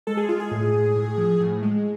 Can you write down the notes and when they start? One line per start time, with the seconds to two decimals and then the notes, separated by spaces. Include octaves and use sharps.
0.07 G#3 A4
0.17 G#4
0.29 G#3 F4
0.40 G#4
0.51 A2
0.73 A2
0.96 A2
1.18 F3
1.40 A2
1.62 G#3